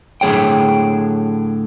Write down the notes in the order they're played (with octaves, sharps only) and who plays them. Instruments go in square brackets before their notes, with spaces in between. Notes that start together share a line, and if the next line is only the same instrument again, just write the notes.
[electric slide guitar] A2 D3 B3 G#4 C#5 G5